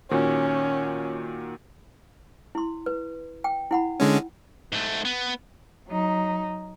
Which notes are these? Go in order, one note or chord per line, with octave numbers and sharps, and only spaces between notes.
A#2 D#3 C#4 F#4
E4 C6
B4
G5
E4 F#5 B5
D3 G#3 C#4
G#2 A3
B3
F#3 D#4